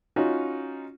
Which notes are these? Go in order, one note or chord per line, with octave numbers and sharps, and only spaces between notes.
C#4 D#4 F4 F#4